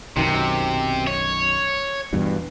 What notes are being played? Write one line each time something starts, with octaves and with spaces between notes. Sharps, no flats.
B1 F#2 C3 D#3
C#5
E2 G2 B2